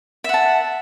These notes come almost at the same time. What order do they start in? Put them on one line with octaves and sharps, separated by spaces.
E5 F#5 A5